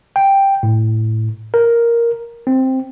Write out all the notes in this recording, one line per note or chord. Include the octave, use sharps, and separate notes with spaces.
G5
A2
A#4
C4